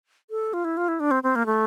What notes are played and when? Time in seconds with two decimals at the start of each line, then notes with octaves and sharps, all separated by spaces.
0.30 A4
0.53 F4
0.65 E4
0.77 F4
0.88 E4
1.00 D4
1.11 C4
1.23 C4
1.35 A#3
1.46 A3